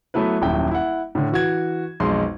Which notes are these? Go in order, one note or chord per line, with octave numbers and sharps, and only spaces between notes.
F#3 A3 B3 E4 B4
D#1 F#2 E4 G5
E4 F#5
A2 D3
E3 F#4 G#6
B1 F2 G#3 C6